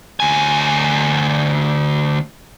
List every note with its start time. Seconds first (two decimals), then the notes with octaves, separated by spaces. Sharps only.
0.20 D2 G#5